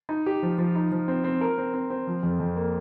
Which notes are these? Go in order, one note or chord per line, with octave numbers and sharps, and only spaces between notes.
D#4
G4
F3
F3
D#4
F3
C4
C4
A#4
C4
C4
C4
F3
F2
F2
A#3